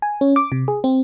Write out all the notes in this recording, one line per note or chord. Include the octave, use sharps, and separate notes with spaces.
G#5
C#4
D6
C3
G#4
C4